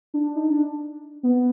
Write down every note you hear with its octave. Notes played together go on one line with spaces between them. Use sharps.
D4
D#4
D4
B3